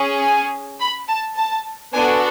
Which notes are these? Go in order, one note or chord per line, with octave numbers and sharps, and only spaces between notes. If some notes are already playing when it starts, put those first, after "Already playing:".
Already playing: C#4 G#4
G#5
B5
A5
A5
B3 D4 F#4 A4 G#5